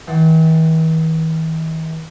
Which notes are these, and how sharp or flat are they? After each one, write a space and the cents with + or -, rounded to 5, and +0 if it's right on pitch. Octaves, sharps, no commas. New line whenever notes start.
E3 -45 F#5 +35 C6 +25